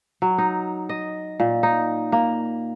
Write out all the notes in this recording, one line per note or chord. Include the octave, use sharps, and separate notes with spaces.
F#3
D#4
D#5
A#2
D#4
A#3